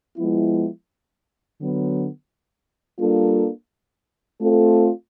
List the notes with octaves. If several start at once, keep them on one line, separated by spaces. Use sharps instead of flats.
F3 G#3 B3 E4
D3 F#3 B3
G3 A#3 D4 F4 A4
A3 C4 F4 A4